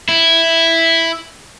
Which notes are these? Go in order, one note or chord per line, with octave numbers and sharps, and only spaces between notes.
E4